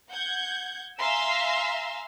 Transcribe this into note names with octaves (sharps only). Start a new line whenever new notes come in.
F#5 G6 G#6
E5 F5 G#5 A#5 C6 E6